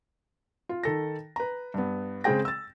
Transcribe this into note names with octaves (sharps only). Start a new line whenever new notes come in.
F4
D#3 A4 A#6
B4 A#5
G2 B3
C#3 G#3 C4 G#4 G5 A#6
E6 A6